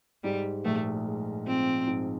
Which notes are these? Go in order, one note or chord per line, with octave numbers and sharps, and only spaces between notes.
G#2 G3
A#1 A3
G#3
F3 C4
G#2